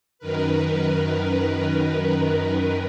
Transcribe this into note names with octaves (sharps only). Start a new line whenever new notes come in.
F#2 D#3 A#4 B4